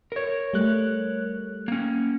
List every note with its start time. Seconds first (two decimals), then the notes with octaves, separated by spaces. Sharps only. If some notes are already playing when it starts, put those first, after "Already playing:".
0.12 A#4 C#5
0.53 G3 A3 F#6
1.68 A#3 C#4